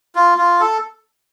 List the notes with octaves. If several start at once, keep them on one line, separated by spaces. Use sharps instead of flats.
F4
F4
A4